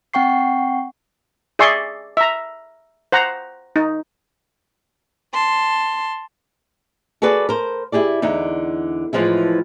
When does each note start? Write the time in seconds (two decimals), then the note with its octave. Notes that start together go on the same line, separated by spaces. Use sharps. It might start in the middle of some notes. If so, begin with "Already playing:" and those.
0.14 C4 F#5 G5 C#6 C7
1.59 G#4 D5 E5 G#5 C6 C#6
2.17 E5 A#5
3.12 C5 F#5 A#5
3.76 D#4
5.33 A5 C6
7.22 F#4 G#4 A4 B4 D5
7.49 A#4 C5
7.92 E4 G4 G#4 D5
8.22 E2 D3 D#4
9.13 A2 E3 F3 G#3 E4